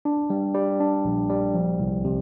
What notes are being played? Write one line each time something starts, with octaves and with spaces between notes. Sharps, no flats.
D4
G3
G3
D4
A#1
G3
F3
C2
C3